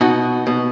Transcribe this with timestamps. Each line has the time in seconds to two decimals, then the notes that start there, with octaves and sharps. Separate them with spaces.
0.01 B2 D#4 F#4
0.47 B2